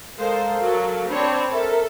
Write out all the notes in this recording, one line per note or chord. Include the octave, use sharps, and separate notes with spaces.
G#3 A4 A#4 C5 F5
F#3
C4 D4 C#5 B5
A4 A#4 E5